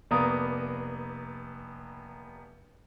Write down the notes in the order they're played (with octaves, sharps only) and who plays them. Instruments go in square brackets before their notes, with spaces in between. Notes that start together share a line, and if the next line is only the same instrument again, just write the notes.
[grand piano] F1 A#3 B3 D5 A#5 D#6